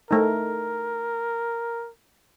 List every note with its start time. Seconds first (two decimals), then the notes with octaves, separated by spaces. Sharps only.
0.11 A3 D#4 A#4